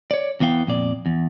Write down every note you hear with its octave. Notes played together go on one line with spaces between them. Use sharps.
C#5 D5
E2 E3 B3 F5 G5
F2 A#2 D5
E2